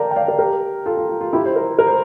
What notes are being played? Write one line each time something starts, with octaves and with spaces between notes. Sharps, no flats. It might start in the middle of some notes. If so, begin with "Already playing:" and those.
Already playing: A#4 D5 F5 G5 A5 A#5
G5
D5 F5
A#4 D5
G4 A#4
F4 A4
F4
F4
F4
E4 G4
C5
G4 A#4
A#4
C5